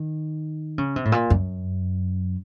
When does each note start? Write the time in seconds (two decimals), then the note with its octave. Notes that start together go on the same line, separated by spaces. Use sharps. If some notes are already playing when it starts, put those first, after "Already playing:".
Already playing: D#3
0.78 C#3
0.96 C3
1.05 A2
1.12 A#2
1.30 F#2